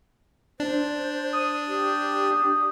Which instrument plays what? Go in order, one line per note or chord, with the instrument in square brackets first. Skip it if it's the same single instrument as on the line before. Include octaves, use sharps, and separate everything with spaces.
[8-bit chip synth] D4 [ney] C5
[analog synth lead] D#6
[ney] G4